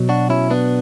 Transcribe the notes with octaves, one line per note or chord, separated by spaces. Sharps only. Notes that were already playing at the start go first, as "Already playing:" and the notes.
Already playing: B2 F#3
D4 F#4
C#4 E4
B3 D4